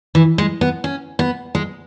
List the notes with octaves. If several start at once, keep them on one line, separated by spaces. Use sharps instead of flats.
E3
G#3
B3
C#4
B3
G#3